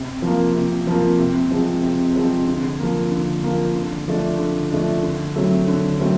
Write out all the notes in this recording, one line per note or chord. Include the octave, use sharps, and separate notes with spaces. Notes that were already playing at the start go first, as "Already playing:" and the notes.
Already playing: C3
F3 A#3
C3
F3 A#3
C3
F3 G#3 C4
C3
F3 G#3 C4
D3
F3 A#3
D3
F3 A#3
D3
F3 A3 D4
D3
F3 A3 D4
D3
F#3 A3 C4
D3
F#3 A3 C4